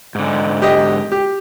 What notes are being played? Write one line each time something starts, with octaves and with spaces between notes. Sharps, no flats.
G#2 D3
G4 D#5
G4